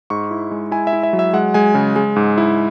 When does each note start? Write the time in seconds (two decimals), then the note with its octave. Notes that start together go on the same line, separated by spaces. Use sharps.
0.10 G#2 C#6
0.31 E4
0.51 G#3
0.71 E4 G#5
0.87 E5
0.93 E4
1.03 E5
1.13 F#3
1.19 E5
1.33 G#3 F#5
1.54 G#3 G#5
1.75 C#3
1.96 G#3
2.16 G#2
2.38 E4